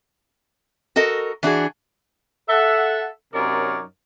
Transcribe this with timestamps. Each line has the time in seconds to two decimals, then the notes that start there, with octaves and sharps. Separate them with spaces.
0.96 F#4 A4 A#4 D#5
1.43 E3 D4 F#4 G#4
2.49 A4 E5 F#5
3.34 F#2 C3 D#4 A#4 C#5 D5